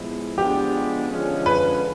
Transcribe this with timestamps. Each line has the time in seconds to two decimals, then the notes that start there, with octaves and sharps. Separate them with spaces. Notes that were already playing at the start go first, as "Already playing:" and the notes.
Already playing: A2 F3 G#3 B3 E4
0.37 F3 G#3 B3 D4 G4
1.10 D3 F3 G#3 C#4
1.46 B4